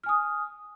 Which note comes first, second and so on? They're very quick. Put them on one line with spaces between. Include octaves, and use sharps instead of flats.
F6 G#5 D#6